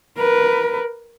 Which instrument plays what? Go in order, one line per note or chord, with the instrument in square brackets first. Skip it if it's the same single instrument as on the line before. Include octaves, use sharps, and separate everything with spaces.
[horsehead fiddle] A#4 B4